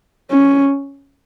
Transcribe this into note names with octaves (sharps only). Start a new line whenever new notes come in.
C#4